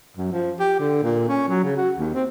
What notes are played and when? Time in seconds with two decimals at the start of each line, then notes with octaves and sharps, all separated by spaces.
0.17 F#2
0.32 F3
0.60 G4
0.80 D3
1.03 A#2
1.28 C#4
1.49 F#3
1.64 C#3
1.76 F#4
1.98 D#2
2.14 C4